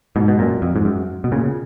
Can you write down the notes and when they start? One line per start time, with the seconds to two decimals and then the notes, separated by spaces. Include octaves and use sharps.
0.16 G#2 B2
0.28 B2
0.39 F#2 A#2
0.62 F2
0.76 G#2
0.85 F#2
1.24 B2
1.32 A#2 C#3